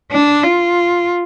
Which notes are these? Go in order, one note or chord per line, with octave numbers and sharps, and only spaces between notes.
D4
F4